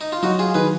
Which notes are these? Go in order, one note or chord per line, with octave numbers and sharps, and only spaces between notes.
D#4
F4
F#3 D#4 F#4
F4 G#4
D#3 G#4 B4